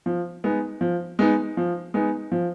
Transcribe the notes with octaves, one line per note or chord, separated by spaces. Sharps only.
F3
G#3 B3 D#4
F3
G#3 B3 D#4
F3
G#3 B3 D#4
F3